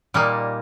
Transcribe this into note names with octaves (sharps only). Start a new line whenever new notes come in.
A#2 G3 A#3 D#4